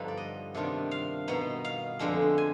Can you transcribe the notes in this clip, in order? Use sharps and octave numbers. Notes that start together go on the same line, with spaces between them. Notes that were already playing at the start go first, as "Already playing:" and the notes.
Already playing: G2 D3 F3 B3 D#4 B4
D5
D#5
C3 D#3 B3 D4 F4
F5
B2 B3 D#4
F5
F2 D3 G#3 B3 D4
G#5